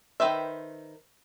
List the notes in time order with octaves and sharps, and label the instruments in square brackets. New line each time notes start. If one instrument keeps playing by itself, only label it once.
[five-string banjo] D#3 B4 C5 E5